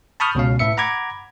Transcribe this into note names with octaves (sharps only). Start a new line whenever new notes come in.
A5 B5 C#6 D#6 F6 G6
C#2 B2 C#4 F5
A2 B4 E5 C#7
F#5 A#5 B5 D6 G#6